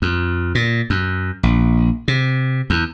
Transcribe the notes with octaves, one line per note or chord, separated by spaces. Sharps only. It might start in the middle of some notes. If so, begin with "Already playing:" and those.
F2
A#2
F#2
A#1
C3
E2